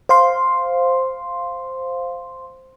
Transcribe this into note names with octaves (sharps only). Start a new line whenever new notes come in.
C5 F5 C6